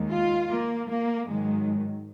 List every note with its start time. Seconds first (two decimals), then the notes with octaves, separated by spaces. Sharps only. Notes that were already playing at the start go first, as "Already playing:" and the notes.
Already playing: D#2 D#3 G#3
0.11 F4
0.51 A#3
0.88 A#3
1.26 G#2 D#3 F#3 G#3